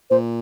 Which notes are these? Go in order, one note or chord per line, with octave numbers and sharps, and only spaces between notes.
A#2 C5